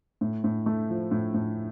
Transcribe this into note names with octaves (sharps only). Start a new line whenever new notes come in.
A2
A2
A3
F3
A2
A2